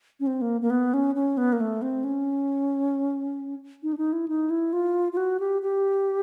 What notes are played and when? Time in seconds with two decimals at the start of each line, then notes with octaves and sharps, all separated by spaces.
0.20 C#4
0.27 C4
0.41 A#3
0.62 A#3
0.70 B3
0.94 C#4
1.15 C#4
1.37 B3
1.53 A#3
1.60 A3
1.82 C4
2.04 C#4
3.83 D#4
3.93 D4
3.97 D#4
4.13 E4
4.28 D#4
4.50 E4
4.73 F4
5.13 F4
5.17 F#4
5.40 G4
5.62 G4